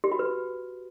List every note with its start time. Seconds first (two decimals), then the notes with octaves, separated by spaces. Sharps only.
0.04 G4
0.12 F#4
0.19 B4